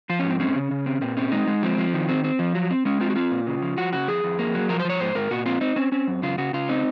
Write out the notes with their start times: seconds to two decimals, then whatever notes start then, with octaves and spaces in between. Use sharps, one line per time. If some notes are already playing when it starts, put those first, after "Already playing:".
0.09 F3 F4
0.19 C#4
0.25 G#2 C4
0.40 C4 C#4
0.56 C#3
0.71 C#3
0.86 C4
1.01 A#2 C4
1.17 C4 C#4
1.32 G#3 D#4
1.47 G#3
1.63 F3 C4
1.78 F3
1.94 D#3
2.09 C4
2.24 C4
2.39 F3
2.55 F#3
2.71 C4
2.85 G#3 C#4
3.01 C4 F4
3.10 F#4
3.16 C4 F4
3.31 A#2
3.47 C#3
3.62 F3
3.77 F3 F#4
3.93 C#3 F#4
4.08 F2 G#4
4.24 F2
4.39 A#3
4.54 F#3
4.69 F3 A#4
4.80 C5
4.85 F3 C#5
5.00 G#2 C5
5.15 G#2 A#4
5.31 A#2 F#4
5.46 C4 F4
5.61 C4 D#4
5.76 C4 C#4
5.92 C4 C#4
6.08 F#2
6.23 C#3 F4
6.38 C#3 F#4
6.53 C#3 F4
6.69 C4 D#4